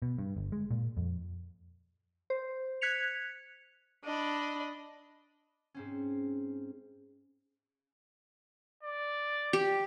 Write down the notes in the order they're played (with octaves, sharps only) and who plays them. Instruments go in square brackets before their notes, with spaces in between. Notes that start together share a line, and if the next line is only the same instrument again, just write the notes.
[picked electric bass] B2
G2
G1
G#3
A#2
F2
[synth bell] C5
F#6 G#6 B6 C#7 F7
[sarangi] D4 [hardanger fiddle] D#5 B5
[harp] G#2 C4 C#4
[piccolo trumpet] D5
[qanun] G4